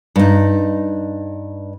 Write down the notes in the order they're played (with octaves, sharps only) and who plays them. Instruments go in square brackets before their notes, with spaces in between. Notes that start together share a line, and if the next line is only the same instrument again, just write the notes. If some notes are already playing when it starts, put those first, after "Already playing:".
[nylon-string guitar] G2 D#4